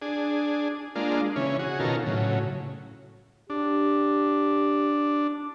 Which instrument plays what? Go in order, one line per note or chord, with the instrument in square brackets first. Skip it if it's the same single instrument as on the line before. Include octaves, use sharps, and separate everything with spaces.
[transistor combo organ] D4 G#4
G#3 A#3 D4 F4
C#3 E3 C#4
F#4 G#4
B2 D#3 C#4 F4 A4 A#4
A2 C#3 F#3
[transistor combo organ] D4 [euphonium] G4